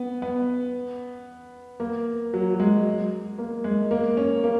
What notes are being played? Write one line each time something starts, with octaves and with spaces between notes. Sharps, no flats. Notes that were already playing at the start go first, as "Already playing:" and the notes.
Already playing: B3
B3
A#3
F#3
F#3
G#3
A#3
G#3
A#3
C#4
A#3